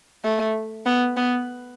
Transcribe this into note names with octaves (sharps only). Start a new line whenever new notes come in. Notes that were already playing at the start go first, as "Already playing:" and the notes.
A3
B3
B3